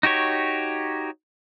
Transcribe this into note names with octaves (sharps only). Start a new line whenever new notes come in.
D#4 F#4 G4 C#5